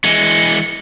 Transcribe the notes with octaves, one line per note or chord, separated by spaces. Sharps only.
E3 G#3 C#7